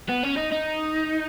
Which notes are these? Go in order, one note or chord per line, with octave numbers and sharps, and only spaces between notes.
B3
C#4
D#4
D#4